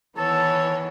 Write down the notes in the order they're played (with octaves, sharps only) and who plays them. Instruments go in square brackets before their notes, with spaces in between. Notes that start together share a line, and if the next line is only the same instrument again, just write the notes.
[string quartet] D#3 E3 B3 [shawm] A4 [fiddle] C#5 [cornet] A5